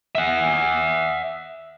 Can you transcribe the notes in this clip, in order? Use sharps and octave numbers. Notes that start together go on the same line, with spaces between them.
E5 F#5